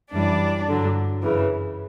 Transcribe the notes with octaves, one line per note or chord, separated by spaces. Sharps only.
F#2 E3 G3 D4 D5
G2 D3 F#3
F#2 C#3 E3